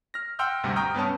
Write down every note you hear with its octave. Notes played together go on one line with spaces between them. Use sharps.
F6 A#6
F#5 G5 C6 E6 F6 G6
D2 G2 C3 G3
G5 A#5 C#6 D#6 F6 G6
G2 B3 C#4 A5